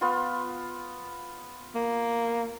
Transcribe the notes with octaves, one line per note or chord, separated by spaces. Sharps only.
B3 F4
A#3